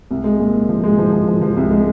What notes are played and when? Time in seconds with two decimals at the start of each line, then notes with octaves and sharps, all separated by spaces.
0.11 C2
0.24 G#3
0.40 A#2
0.54 A#2
0.69 F3
0.84 G#3
0.98 F3
1.12 F3
1.27 F3
1.42 F3
1.57 C2
1.71 G#3